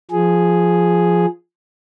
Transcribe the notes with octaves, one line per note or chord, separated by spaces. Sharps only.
F3 G#4